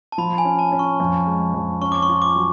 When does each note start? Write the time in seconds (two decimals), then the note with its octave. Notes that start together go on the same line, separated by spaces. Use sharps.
0.12 A5
0.18 F3 B5
0.38 G#5
0.45 C#4
0.59 A5
0.72 C#4
0.79 C#6
1.00 F2
1.27 G#3
1.54 F2
1.81 C#4 C#6
1.92 D6
2.02 C#6
2.09 F4
2.22 D6
2.36 F#3